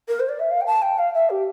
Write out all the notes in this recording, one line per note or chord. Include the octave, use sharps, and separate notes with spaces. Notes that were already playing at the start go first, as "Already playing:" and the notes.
A#4
C5
D5
E5
F5
G5
A5
G5
F5
E5
G4